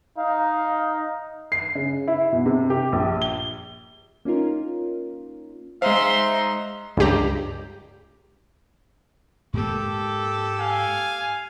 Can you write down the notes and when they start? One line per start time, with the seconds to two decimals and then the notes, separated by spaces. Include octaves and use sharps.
0.18 D#4 F5
1.52 C7
1.75 C#3
2.08 E4
2.33 B2
2.46 C3
2.70 G4
2.92 A#1
3.22 G7
4.25 A#3 C#4 D#4 F4 A#4
5.82 G#3 D#4 C5 E5 F5 C6
6.97 C#2 G2 G4 A#5
9.54 G#2 A#3 G4 A4
10.59 F5 G#5